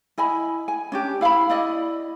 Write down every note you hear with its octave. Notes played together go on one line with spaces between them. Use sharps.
E4 D#5 G#5 B5
G#5
C#4 D4 G4
E4 F5 G5 B5
E4 D5 D#5